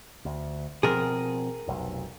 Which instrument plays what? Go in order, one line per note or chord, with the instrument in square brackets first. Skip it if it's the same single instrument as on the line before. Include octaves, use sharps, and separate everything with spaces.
[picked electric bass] D2
[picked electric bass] B2 F3 C4 [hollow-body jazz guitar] G#4 A#4
[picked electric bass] F1 B1